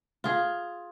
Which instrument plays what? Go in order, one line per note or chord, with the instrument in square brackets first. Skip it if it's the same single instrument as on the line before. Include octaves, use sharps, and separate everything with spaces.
[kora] F4 G#4